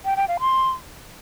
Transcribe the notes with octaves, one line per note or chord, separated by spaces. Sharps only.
G5
G5
F5
C6